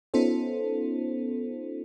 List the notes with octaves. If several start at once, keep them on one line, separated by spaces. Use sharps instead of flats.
B3 C#4 D#4 F4 A4 C5